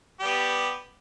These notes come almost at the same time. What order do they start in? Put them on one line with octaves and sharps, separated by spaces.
G4 G3 B3